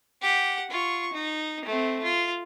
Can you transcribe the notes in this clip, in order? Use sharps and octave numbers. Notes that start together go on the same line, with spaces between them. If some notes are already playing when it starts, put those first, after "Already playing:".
G4 F#5
F4 C#6
D#4
A3 C4
F4